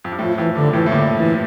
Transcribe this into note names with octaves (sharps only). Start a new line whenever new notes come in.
F2
G2
F2 A2 F3
F2 E3
G2 D3
F2 A2 E3
A2
G2 A#2 D3
E3